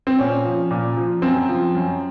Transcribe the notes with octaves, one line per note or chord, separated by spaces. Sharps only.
C4
A#2 C#4
F3
A#2
F3
F#2 C4
F3
F#2